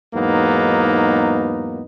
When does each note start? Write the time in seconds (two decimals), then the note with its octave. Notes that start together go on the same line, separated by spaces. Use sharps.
0.15 E2 G#2 F#3 A#3 B3 D#4